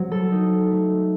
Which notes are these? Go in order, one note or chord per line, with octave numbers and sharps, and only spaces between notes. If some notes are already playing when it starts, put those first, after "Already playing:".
Already playing: F#3 C4
A4
D#4
A3